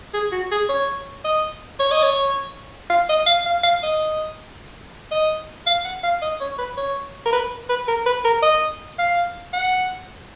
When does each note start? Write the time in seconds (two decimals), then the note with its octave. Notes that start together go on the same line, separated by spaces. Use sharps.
0.14 G#4
0.32 F#4
0.51 G#4
0.69 C#5
1.25 D#5
1.79 C#5
1.92 D#5
2.03 C#5
2.90 F5
3.09 D#5
3.26 F5
3.46 F5
3.63 F5
3.83 D#5
5.11 D#5
5.67 F5
5.84 F#5
6.04 F5
6.22 D#5
6.41 C#5
6.59 B4
6.77 C#5
7.26 A#4
7.33 B4
7.69 B4
7.88 A#4
8.06 B4
8.25 A#4
8.43 D#5
8.99 F5
9.53 F#5